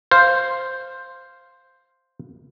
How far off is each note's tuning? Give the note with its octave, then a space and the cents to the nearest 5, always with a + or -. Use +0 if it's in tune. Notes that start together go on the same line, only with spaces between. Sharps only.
C5 +0 F5 +0